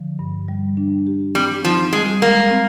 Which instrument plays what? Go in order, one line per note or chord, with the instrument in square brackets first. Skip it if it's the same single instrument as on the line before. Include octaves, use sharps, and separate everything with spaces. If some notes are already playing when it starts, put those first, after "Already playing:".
Already playing: [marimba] D3 F3
G2
G3
D4
G4
[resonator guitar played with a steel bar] G3 [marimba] C4
[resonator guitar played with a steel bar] F3 [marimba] D#4
[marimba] G3 [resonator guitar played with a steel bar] G#3
[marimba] G#3 [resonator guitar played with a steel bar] A#3
[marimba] C4